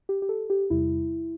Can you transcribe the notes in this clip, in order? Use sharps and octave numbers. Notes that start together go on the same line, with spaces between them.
G4
G4
A4
G4
E2 C3 G3 E4